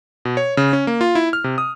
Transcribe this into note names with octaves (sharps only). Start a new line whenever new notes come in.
B2
C#5
C#3
C#4
A#3
F4
E4
F6
C3
D#6